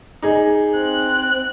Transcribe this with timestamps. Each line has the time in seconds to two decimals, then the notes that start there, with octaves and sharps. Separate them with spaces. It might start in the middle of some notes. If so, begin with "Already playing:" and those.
0.22 D#4 G#4
0.74 C4 F#6